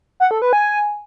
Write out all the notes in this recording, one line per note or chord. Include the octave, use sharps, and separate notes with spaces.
F#5
A4
B4
G#5